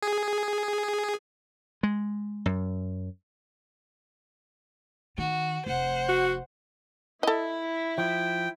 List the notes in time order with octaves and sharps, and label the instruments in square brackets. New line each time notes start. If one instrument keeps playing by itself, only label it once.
[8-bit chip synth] G#4
[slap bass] G#3
F#2
[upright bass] D#3 [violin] F#4
[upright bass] F1 [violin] C5 F#5
[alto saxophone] F#4
[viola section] E4 [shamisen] A4 D#5
[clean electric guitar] F3 [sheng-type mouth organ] G5